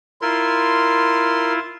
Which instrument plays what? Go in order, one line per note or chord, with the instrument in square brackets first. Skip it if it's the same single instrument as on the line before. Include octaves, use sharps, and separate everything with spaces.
[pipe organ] E4 F4 [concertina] A#4 C6